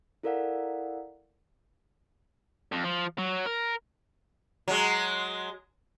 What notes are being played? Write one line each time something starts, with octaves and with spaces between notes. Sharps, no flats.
E4 A4 A#4 D5 F5 F#5
F2
F3
F#3
A#4
F#3 G#3